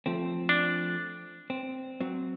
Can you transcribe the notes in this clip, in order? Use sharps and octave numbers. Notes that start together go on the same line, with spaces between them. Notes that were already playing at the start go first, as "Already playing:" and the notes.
F3 A3 C4
D4
C4
F#3 C4